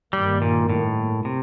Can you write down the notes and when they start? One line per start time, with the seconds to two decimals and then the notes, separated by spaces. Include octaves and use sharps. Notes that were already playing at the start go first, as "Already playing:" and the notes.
0.13 G2 D#3 G3 A#3
0.42 A#2
0.70 A2
1.25 C3